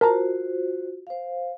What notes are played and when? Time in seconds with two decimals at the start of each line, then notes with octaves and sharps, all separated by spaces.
0.01 F4 F#4 A#4 C5 A5 A#5
1.07 C5 F5